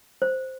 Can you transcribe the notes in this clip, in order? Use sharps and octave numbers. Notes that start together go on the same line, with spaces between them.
C5